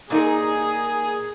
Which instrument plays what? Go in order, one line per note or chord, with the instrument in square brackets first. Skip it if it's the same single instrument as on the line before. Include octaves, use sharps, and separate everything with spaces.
[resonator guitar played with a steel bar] A#2 D#4 A#4 [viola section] G#4